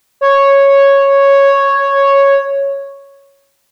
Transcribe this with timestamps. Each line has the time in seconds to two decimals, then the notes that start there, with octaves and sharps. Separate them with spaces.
0.21 C#5